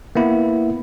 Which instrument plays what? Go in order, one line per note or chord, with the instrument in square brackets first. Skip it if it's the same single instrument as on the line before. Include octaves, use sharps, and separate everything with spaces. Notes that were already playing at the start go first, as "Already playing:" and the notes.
[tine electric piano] A#3 B3 E4